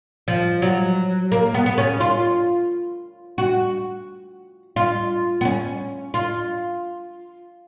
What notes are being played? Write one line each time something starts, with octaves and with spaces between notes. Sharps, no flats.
F3
F#3
A#3
B3
B3
C#4
F4
F#4
F4
B3
C#4
F4